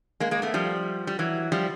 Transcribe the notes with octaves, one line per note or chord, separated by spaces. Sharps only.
G#3 A#3
G#3 A#3
A3 B3
F3 G3
G3
E3 F#3
F3 G3